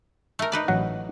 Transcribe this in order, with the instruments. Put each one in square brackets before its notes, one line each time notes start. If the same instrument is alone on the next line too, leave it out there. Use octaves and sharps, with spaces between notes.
[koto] A3 A#4
D#4 B4 D5
[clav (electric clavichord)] A1 F#3 F#5